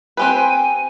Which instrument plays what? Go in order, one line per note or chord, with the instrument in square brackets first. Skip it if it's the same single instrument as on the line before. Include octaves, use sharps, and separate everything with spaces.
[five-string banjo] C4 G4 B4 [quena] G#5